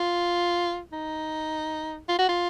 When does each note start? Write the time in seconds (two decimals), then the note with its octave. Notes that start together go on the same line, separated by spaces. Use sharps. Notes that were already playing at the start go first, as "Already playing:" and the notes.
Already playing: F4
0.92 D#4
2.09 F4
2.19 F#4
2.29 F4